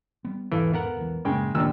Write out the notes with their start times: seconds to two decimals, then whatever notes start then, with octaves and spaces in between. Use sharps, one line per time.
0.25 G3 B3
0.52 E2 G#2 B2 E3 A4 F5
0.74 B3 A#4 F#5
0.97 E1 B1 E3
1.25 A1 F#2 C#3 G#3 A#3 G5
1.55 F#1 D#2 A#2 F3 C#4 D4 E6